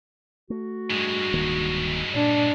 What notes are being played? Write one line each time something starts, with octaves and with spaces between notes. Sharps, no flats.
A3 F#4
G2 G#3
D1 D#3 A#3
A#2 D4